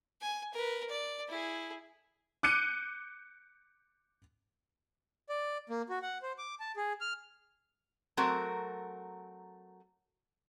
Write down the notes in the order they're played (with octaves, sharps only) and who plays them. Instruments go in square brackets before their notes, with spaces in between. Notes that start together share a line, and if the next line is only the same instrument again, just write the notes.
[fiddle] G#5
A#4 B4
D5
E4 G#4
[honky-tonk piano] D6 F#6 G6 C#7 D#7
[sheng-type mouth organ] D5
A#3
F#4
F#5
C5
D6
A5
G#4
F6
[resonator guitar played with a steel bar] F#3 A3 C4 F#4 A#4